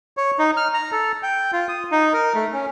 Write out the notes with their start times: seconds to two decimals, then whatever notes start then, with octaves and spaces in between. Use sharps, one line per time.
0.17 C#5
0.39 D#4
0.57 F6
0.74 A#5
0.92 A4
1.23 G5
1.53 F4
1.69 D#6
1.92 D#4
2.13 A#4
2.35 A3
2.53 C#4